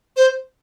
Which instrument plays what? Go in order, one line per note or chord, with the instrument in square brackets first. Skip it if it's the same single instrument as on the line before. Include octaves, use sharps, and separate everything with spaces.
[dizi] C5